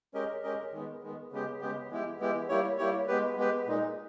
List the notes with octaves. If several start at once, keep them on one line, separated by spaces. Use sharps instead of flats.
G#3 C#4 G4 A#4 D#5
G#3 C#4 G4 A#4 D#5
D#3 G#3 B3
D#3 G#3 B3
C#3 G#3 B3 G4
C#3 G#3 B3 G4
E3 G#3 B3 E4 G4
E3 G#3 B3 E4 G4
G3 A#3 E4 G4 C#5
G3 A#3 E4 G4 C#5
G#3 B3 G4 B4
G#3 B3 G4 B4
A#2 G#3 D#4